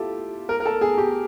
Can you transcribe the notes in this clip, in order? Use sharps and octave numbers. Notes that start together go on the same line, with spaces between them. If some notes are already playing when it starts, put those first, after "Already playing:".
Already playing: E4 F4 G4 A4
A#4
A#4
A4
G#4
G4